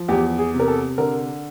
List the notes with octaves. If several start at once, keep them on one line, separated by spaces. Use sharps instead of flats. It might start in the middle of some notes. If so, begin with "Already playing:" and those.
Already playing: F3
E2 G4
G#4
C3
A#4
A4
D3 A#4